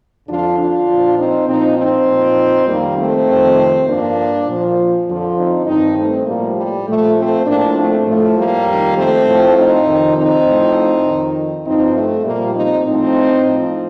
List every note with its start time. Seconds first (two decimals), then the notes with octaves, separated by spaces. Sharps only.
0.27 F2 D3 F3 D4 F4
0.57 D4 F4
0.88 A#2 F3
1.17 C4 D#4
1.47 A#2 F3 C4 D#4
1.77 C4 D#4
2.07 A#2 F3
2.67 F2 D#3 G3 A#3
2.96 A3 C4
3.27 F2 C3 D#3
3.86 G2 F3 A#3 D4
4.46 A#2
4.51 F3
5.06 F2 D3 F3
5.36 C4 D#4
5.66 G2 D#3 C4 D#4
5.96 A3 C4
6.26 A2 F3 G3 A#3
6.56 G3
6.87 A#2 F3 A3
7.16 A3 C4
7.46 A2 F3 A#3 D4
7.76 A3 C4
8.06 A2 F3 A3
8.36 G3 A#3
8.65 F2 D#3
8.95 A3 C4
9.25 A2 F3
9.55 C4 D#4
9.85 F2 C3 D#3
10.15 C4 D#4
10.45 A2 F3
11.05 F2 D#3
11.64 G2 F3 C4 D#4
11.94 A3
12.24 A#2 F3 G3 A#3
12.55 C4 D#4
12.84 A2 F3 C4 D#4
13.44 A2 F3